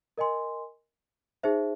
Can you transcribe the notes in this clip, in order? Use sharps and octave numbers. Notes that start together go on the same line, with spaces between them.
A#4 D#5 G#5 C6
D#4 G#4 C5 E5